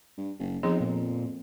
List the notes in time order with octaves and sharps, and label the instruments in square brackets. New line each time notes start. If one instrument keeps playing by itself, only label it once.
[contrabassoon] G2
F#1
[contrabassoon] F2 [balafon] F3 B3 G#4 [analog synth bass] D#4
[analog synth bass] A#2